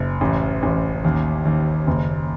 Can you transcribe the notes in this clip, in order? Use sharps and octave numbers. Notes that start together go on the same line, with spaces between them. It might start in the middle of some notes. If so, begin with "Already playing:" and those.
Already playing: F#1
A1
A1
D#2
D#2
F#1